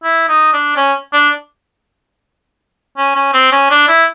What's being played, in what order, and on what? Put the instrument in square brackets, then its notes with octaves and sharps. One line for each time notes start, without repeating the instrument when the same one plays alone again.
[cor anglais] E4
D#4
D4
C#4
D4
C#4
C#4
C4
C#4
D4
E4